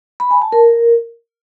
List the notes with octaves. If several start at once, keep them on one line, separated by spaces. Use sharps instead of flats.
B5
G#5
A5
A#4